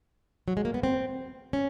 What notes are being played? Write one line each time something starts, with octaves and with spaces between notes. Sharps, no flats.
F#3
G#3
A#3
B3
C4
C#4